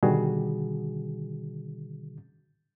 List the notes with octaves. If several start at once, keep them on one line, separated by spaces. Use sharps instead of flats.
B2 D3 D#3 G3 F#4 G#4